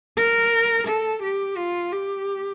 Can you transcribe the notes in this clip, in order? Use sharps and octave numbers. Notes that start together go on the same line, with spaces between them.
A#4
A4
G4
F4
G4